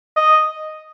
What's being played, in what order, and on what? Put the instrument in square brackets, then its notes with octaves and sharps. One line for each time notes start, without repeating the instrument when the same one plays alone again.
[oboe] D#5